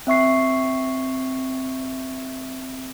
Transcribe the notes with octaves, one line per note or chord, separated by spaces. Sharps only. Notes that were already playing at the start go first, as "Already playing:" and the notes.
C4 E5 C#6 C7